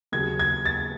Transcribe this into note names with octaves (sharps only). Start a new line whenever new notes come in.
D#2 C#3 F#3 G#6
G#6
A6